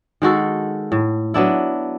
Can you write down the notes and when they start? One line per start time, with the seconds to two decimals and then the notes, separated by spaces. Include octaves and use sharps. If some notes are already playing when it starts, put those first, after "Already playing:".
0.22 D#3 G#3 F#4 A4
0.92 A2
1.34 F#3 B3 D4 E4